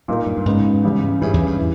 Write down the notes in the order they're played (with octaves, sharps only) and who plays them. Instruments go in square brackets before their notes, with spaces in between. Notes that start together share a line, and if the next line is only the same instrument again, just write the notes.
[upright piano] A#2 A#3 D#4 A#4 [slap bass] G3
[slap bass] G2
G2
[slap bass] G#2 [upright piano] C#3 G#3 B3 D#4
[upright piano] E2 C#3 G3
[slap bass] G2 [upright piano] E3 G3 C#4 E4 G#4
[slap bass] E2
G2
[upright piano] E3